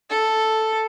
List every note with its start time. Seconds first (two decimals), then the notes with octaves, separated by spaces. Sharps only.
0.10 A4